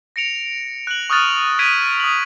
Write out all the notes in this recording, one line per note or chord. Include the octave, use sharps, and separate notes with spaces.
A#6 C#7 D7 F7
F#6 F#7
C#6 D#6 F6 F#6 A6 F7
D#6 G#6 B6 D7 D#7
D#6 F#7